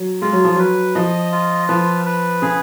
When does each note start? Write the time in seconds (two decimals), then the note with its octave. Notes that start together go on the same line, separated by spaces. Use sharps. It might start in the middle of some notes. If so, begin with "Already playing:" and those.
Already playing: F#3
0.22 G#3 F4
0.33 F#3
0.44 F3
0.55 F#3 B4
0.95 F3 D#5
1.32 F4
1.68 F3 B4
2.06 B4
2.42 C#3 G#4